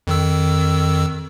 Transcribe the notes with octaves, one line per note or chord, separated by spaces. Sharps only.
F2 D#3 E6